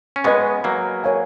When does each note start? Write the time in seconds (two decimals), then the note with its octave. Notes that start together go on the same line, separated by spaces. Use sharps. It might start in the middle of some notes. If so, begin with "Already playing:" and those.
0.16 C#4
0.24 G#3 B3 B4 D#5 G#5 C#6
0.64 F#3 A#3
1.04 A#4 C#5 F5 G#5